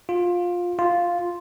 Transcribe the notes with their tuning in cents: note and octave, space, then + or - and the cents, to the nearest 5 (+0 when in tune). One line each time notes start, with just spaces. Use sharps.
F4 +15
F4 +0